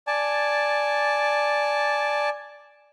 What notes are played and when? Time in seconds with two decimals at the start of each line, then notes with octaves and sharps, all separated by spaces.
0.07 D5 G#5 A5